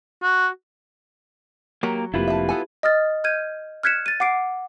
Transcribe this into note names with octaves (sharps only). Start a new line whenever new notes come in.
F#4
F#3 A#3 G4 A#4
F1 F2 A#3 E4 F4 G4 B4
E5 A5
B3 A4 G#5
D#5 D#6 F6 A6
D#5 F6 G6 G#6 D#7
F6 F#6 G#6 B6 C#7 E7
A6 D#7
F#5 D6 C7 D7